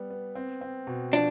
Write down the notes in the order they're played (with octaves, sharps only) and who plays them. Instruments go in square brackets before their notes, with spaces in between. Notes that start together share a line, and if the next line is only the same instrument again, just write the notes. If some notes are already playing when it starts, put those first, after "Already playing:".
Already playing: [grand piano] G3 B3
B3
C4
C4
B2
[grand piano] F3 [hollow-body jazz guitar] D4